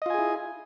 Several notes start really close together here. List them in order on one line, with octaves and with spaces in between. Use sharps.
D#5 F4 G#5 G#4 E4